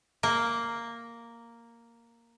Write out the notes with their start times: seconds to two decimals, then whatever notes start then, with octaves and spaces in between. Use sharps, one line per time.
0.23 A#3